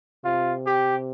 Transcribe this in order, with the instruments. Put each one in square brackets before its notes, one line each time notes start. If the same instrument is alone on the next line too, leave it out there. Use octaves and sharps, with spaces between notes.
[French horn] C3 [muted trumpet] F4
[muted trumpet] G4